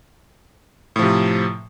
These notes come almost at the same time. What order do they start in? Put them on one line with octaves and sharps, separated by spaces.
A2 F3 C3